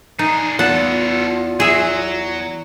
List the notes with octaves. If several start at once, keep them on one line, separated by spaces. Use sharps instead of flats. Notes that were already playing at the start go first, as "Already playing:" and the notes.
D4 D#4 G#4
E2 B3 F4 A4 F#5 A5
F#3 G#4 E5